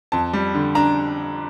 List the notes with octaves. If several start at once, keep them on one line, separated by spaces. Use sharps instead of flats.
F2 A5
G3
D3
D4 A#5